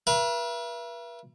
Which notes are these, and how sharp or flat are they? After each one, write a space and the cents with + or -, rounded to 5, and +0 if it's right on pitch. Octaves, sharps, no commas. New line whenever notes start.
B4 -45 E5 +40